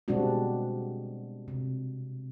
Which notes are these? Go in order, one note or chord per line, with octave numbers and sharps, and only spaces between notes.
B2 G3 G#3 C4 D4 F#4
C3